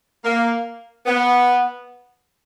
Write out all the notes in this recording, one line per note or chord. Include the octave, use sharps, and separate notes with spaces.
A#3
B3